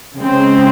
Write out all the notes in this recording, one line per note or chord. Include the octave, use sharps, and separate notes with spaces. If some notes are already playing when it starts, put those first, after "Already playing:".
C#3 G#3 C4